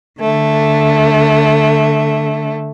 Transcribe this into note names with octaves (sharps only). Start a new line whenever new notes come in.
D3 A3